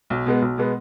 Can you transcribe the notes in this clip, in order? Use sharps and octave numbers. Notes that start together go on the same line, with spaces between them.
B1
B2 G#3 B3
B1
B2 G#3 B3